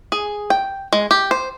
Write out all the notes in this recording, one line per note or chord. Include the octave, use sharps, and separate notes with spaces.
G#4
G5
G#3
G4
C5